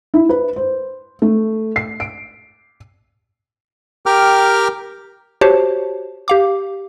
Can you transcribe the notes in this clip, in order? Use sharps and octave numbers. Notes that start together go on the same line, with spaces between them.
E4
B4
C5
A3
C7
D7
G4 A#4 G5 D6 F6
F#4 G4 C5 C#5 A5
G4 F5 D6